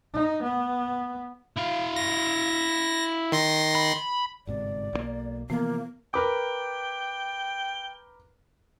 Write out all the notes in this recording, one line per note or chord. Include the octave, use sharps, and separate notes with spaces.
D#4
B3
E4 F5
A#6
D#3 C6 A#6
B5
G1 G#2 C3 D5
B1 D#3 A#3
C3 E3 F3 A#3 B3 A#4
A#4 B4 G5 D6